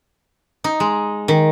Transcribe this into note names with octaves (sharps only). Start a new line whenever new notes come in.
D#4
G#3
D#3